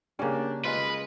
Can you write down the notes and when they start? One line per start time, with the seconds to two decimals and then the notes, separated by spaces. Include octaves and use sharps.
0.19 C#3 G3 A#3 C#4 D4
0.65 G#3 F4 B4